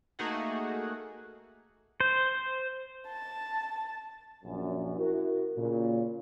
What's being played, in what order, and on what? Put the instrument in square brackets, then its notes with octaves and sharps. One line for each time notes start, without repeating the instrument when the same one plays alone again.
[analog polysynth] A3 A#3 D#4 F#4 G#4 F#5
[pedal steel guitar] C5
[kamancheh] A5
[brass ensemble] A#1 F#2
E4 F#4 A#4
A#2 C#3